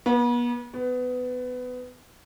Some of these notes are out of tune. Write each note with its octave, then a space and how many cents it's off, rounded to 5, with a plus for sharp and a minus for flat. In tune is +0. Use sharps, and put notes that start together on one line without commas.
B3 -40
B3 +20